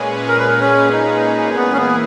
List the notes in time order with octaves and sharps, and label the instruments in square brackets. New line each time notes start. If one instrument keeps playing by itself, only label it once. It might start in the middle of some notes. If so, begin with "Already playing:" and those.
Already playing: [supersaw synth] A#2 G#3 C#4 G#4 B4
[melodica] A#4
B4
A#4
C#4
D#4
[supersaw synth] E3 A#3 E4 G#4 [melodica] B3
[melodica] C#4
B3